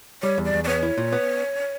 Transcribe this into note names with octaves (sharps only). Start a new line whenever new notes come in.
G3 C#5
E2
D5
E2
D5
B3 C#5
E4
A#2
B3